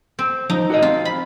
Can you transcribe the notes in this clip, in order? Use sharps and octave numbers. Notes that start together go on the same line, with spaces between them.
C4
F3 D#4
F#4 A#4 D#5
C4 F4
B5